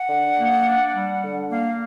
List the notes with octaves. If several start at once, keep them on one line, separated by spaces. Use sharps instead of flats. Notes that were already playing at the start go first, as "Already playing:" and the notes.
Already playing: F#5
D3
A#3
D4
G3
D3
A#3 F5